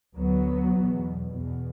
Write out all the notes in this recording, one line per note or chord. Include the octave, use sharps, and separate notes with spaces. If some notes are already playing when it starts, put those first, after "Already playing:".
D2 F#3 B3
E2 B2
E2 B2